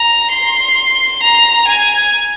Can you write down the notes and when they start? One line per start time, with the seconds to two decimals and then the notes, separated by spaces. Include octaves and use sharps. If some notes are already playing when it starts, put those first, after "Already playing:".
Already playing: A#5
0.31 C6
1.22 A#5
1.68 G#5